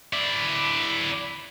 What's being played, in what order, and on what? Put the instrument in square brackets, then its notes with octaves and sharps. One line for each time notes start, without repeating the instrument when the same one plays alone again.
[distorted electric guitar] E4 D5